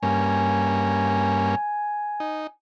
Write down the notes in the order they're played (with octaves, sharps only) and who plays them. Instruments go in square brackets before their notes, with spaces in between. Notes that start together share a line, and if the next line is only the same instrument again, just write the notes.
[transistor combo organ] G2 A#3 C#4 [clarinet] G#5
[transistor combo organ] D#4